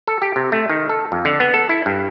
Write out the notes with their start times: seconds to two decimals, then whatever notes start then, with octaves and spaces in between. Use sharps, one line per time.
0.07 A4
0.22 G4
0.36 C3
0.52 A3
0.69 D#3
0.89 A4
1.12 F2
1.25 D3
1.40 B3
1.54 A4
1.69 E4
1.86 G2